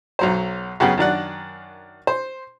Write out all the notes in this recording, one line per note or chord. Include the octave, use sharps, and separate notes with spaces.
B1 F#3 C5
F#2 C#3 B3 F#4 G4
F#2 D#3 D4 F#5
C5